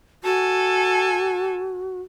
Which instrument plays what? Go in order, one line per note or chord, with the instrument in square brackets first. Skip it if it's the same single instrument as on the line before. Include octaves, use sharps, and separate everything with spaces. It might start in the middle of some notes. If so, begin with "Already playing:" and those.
[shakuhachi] F#4 [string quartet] A4 G#5